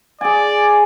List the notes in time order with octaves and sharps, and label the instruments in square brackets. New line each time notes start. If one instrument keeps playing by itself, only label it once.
[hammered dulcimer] G#4 G#5 [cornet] D5